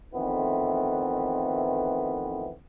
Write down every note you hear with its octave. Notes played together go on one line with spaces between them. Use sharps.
F2 D#3 E3 A3 B3 C4